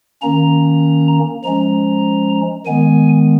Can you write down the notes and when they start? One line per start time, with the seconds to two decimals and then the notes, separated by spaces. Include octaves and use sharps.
0.22 D#3 A#3 C#4 A#5
1.44 F3 G#3 C#4 A#5
2.66 D#3 G#3 B3 G#5